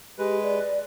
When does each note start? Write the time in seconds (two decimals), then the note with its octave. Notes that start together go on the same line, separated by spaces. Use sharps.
0.18 G#3 G4 B4
0.43 D5